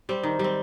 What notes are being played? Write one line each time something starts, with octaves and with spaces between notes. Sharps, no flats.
G3 C4
D#3
G3 C4